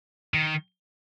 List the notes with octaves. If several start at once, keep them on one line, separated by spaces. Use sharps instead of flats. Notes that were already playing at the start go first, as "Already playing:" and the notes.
D#3